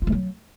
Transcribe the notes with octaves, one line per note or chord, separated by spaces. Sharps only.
F4
G#3
F#3